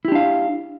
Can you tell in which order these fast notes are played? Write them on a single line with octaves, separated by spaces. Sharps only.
E4 G4 D4 F5